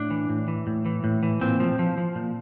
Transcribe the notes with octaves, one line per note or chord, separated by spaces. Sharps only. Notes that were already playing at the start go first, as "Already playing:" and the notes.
Already playing: A2 D4
E3
A2
E3
A2
E3
A2
E3
A#2 C4
F3
F3
F3
A#2